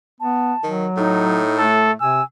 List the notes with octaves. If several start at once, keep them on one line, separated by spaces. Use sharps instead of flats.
B3 A5
D#3 F#3
A2 D#4
A3 A4
C3 G#5 E6